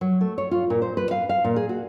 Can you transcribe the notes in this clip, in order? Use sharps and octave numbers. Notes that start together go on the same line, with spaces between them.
F#3
A3
C#5
F4
A#2
C5
B4
F5
F5
A#2
G#4
F#4